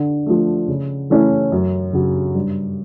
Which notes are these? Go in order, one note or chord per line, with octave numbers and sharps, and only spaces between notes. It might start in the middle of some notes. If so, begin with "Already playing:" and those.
Already playing: D3
F3 A3
C#3
E3 A3 C#4 E4
F#2
C#3 F#3
G2